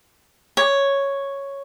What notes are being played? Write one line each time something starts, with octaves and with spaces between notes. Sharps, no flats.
C#5